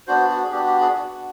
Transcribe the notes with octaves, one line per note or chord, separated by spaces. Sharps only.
B3 D4 F#4 C5
F#4
G#4
B3 D4 F#4 G4
G4
G#4
B3 D4 F#4